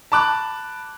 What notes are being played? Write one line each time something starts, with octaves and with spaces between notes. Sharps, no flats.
A5 B5 D6 F#6